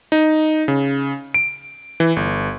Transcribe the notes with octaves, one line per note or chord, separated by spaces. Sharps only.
D#4
C#3
D7
E3
G1